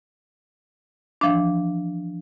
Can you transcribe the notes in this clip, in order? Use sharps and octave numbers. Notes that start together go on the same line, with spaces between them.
E3 F3 D4